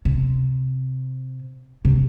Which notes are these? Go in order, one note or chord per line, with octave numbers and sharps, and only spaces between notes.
C3
C3